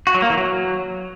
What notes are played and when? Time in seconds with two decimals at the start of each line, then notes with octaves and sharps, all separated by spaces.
0.07 F#4
0.14 F#3
0.22 A#3
0.30 E3
0.37 F#3